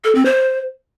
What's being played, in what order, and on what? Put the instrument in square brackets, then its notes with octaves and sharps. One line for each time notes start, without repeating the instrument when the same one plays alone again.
[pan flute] A4
C4
C5